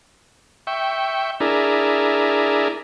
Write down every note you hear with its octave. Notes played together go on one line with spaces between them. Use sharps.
E5 G5 C#6
D4 E4 G#4 A#4